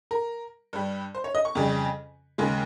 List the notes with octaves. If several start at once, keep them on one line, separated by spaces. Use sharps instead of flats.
A#4
G2 G3
C5
C#5
D#5
C#6
F2 C#3 G3
D#2 C#3 G#3